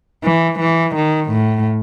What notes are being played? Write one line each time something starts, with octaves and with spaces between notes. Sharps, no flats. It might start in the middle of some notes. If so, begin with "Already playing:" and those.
E3
E3
D#3
A2